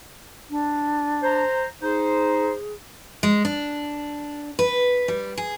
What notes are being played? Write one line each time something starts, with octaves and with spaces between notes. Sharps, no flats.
D4
C5 A#5
D#4 G#4 C5
G#3
D4
B4
G3
G#4